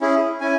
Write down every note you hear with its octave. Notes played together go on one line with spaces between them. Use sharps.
C#4 E4 G#4
C#4 E4 G#5